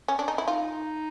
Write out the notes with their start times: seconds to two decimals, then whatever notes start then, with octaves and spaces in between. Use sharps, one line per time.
0.08 C#4
0.19 D4
0.28 D#4
0.38 E4
0.48 D#4 F4